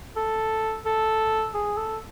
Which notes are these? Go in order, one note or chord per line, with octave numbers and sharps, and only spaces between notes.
A4
A4
G#4
A4